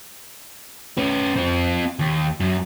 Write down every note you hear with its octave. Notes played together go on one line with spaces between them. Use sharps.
C#4 B4
C4 F4
D#2
F#2